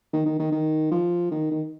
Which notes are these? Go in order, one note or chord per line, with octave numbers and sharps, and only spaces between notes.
D#3
D#3
D#3
D#3
F3
D#3
D#3